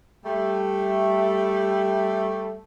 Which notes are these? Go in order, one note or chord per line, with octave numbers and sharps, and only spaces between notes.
G3 A3